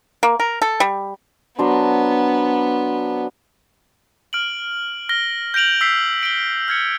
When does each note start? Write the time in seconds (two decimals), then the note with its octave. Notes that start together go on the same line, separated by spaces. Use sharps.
0.23 A#3
0.40 A#4
0.62 A4
0.80 G3
1.59 F#3 B3 D4 C5
4.33 F6 D7 F#7
5.09 F6 A#6 G7
5.54 G6 A#6 D7 F7 F#7
5.81 E6 B6 C7
6.23 D7 G7
6.68 F6 G#6 C#7